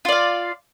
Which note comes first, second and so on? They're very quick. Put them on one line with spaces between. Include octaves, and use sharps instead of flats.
F4 D5 F5